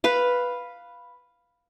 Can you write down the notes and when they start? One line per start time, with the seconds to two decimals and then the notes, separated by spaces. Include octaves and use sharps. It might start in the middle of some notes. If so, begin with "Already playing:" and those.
0.04 B4 F5